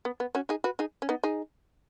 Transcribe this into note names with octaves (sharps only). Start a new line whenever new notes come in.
B3
B3
C#4 F#4
D#4 G#4
F#4 B4
D#4 G#4
C#4
B3 D#4
D#4 G#4